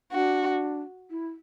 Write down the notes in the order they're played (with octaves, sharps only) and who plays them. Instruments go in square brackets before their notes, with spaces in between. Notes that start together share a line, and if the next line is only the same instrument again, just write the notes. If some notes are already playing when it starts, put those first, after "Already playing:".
[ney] D4 [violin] F#4
[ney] E4